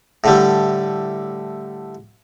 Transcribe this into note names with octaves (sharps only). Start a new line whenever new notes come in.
A2 D3 G3